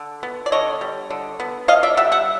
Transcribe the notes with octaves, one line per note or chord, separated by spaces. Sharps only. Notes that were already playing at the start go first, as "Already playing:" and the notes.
Already playing: D3
B3
D5
D3 C#5 D#5
G3
D3
B3
D3 D#5 F5
D5 E5
G3 E5 F#5
E5 F#5